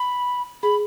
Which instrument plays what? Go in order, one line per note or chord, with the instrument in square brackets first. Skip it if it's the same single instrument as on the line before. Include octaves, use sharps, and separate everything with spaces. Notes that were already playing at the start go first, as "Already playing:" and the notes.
Already playing: [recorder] B5
[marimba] G#4 [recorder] B5